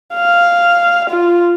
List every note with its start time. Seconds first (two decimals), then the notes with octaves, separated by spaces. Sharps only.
0.15 F5
1.10 F4